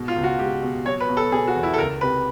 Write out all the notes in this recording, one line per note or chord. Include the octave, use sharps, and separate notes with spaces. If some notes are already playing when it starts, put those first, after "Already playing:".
Already playing: G#2 B2
F4
C#2
F#4
G#3 G4
B2
F#3 C#5
B4
B2
A4
B2 G#4
F#4
E2
E4
A4
C#2 A#4
C3 B4